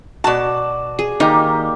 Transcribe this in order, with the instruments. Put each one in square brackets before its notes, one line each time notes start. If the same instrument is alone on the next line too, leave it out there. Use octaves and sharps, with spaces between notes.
[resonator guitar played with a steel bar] B2 A5 [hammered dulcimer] F#4 D5
[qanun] G#4
[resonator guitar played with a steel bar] D#3 [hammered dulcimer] A#3 G4 [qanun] D#4